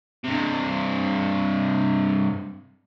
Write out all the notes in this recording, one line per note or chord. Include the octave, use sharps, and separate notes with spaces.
G2 C3